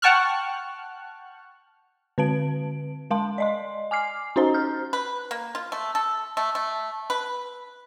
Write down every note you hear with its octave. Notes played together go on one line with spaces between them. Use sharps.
F#5 G5 A5 C#6 F6 F#6
D3 C4 B4 A5 D7
G#3 A#4 F5 A5 C6
D5 D#5 C6
G#5 D6 F6 C7
C#4 D#4 F#4 C5 D#5 A#5
F6 G6
B4
A#3
F4
A3
A4
A3
A3
B4